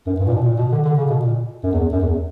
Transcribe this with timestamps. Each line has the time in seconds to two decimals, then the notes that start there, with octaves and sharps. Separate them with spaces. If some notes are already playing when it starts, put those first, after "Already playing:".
0.07 F#2
0.19 G2
0.27 A#2
0.33 B2
0.45 A#2
0.58 B2
0.72 D3
0.85 D3
0.97 C#3
1.10 B2
1.24 A#2
1.63 F#2
1.73 E2
1.93 F#2
2.03 E2